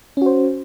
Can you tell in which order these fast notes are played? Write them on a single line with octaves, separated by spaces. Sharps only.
C#4 F#4 C5